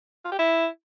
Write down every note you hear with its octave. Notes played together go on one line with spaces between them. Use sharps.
F4
G4
E4